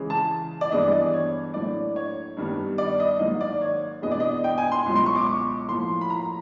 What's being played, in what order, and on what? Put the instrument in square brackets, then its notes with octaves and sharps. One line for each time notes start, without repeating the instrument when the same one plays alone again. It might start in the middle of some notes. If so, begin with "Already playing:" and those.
Already playing: [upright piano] C#3 E3 G#3
A5
D5
G2 E3 G#3 B3 D4 D#5
D5
C#5
A2 F#3 A#3 D4 D5
C#5
G2 D#3 G3 B3
D5
D#5
G#2 D#3 F#3 A#3 D#5
D5
C#5
E2 B2 G#3 B3 D4 D#5
D5
D#5
G5
G#5
C6
C#2 B2 F#3
C6
C#6
D6
C#6
A2 F3 A#3 C6
B5
A#5